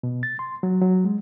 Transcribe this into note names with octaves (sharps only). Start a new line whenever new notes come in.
B2
A6
C6
F#3
F#3
G#3